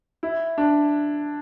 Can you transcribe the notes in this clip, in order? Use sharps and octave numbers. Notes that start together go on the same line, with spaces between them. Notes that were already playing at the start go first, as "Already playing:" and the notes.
E4
D4